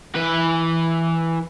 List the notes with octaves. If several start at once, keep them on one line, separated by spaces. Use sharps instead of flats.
E3 B4